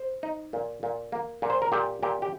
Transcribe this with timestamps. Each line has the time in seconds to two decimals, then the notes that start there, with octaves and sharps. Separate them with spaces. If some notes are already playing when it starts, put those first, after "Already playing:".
Already playing: C5
0.23 D#4
0.53 A#2
0.83 A#2
1.12 A#3
1.42 A#2
1.50 C5
1.62 A#4
1.72 A#2 G4
2.02 A#2 G4
2.22 G4